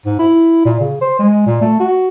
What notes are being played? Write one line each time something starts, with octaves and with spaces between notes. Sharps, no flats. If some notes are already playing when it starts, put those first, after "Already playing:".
G#2
E4
A#2
C#3
C5
G#3
A#2
A3
F#4